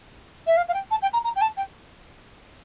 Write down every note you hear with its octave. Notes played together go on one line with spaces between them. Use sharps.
E5
F5
F5
G5
A5
G5
A#5
A#5
G5
A5
G5